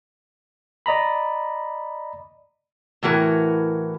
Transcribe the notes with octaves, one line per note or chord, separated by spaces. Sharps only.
D5 D#5 A#5 B5
A2 E3 F#4 A#4